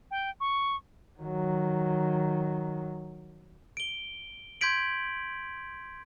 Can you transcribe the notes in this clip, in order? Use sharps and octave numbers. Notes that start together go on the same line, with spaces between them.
G5
C#6
D#3 F#3
D7 G7
C6 G6 G#6 B6 D7 F#7